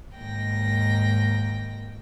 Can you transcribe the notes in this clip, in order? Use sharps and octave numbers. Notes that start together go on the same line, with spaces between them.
D#2 G#2 G5 A#6